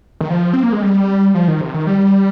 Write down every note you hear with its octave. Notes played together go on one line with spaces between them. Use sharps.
D#3
F3
C4
A#3
G#3
G3
F3
D#3
C3
D#3
G3